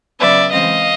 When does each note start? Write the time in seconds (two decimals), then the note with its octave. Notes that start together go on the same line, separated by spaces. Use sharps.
0.19 C#3 F#3 B3 D5 E5
0.52 C#3 E3 G#3 C4 D#5 F5